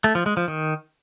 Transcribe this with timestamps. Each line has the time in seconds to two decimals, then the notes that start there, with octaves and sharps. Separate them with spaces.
0.04 A3
0.15 F3
0.26 G#3
0.37 F3
0.48 D#3